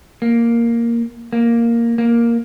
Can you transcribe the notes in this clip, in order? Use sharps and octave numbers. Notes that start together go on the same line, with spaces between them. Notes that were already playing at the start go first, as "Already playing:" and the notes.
A#3
A#3
A#3